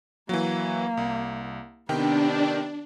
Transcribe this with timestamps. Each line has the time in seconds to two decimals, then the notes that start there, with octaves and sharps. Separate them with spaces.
0.29 E3 F#3 A#3
0.97 C2
1.89 C3 D#3 B3 D4 G4 G5